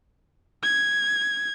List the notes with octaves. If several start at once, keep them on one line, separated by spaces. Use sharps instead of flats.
G#6